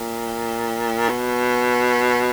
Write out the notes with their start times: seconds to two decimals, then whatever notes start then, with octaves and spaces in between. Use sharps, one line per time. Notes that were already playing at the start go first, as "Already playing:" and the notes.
Already playing: A#2
1.09 B2